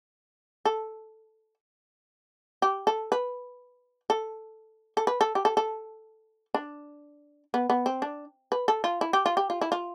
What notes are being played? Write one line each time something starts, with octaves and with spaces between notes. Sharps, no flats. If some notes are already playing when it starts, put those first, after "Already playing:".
A4
G4
A4
B4
A4
A4
B4
A4
G4
A4
A4
D4
B3
B3
C4
D4
B4
A4
F4
E4
G4
F4
G4
F4
E4
F4